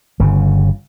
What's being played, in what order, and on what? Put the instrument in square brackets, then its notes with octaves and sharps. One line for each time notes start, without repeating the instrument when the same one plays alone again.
[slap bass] G1 C#3